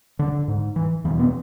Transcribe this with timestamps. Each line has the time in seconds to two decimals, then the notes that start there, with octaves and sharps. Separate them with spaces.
0.19 D3
0.48 G#2
0.76 E3
1.04 E2 E3
1.09 B2
1.19 B3